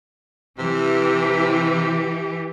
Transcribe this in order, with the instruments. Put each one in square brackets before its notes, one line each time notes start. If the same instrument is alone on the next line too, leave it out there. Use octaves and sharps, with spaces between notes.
[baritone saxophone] C3 [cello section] E3 G4